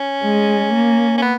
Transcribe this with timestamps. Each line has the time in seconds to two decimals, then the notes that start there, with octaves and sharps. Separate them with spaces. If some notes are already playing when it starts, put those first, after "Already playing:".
Already playing: C#4
0.23 G#3
0.72 A#3
1.18 C#4
1.22 B3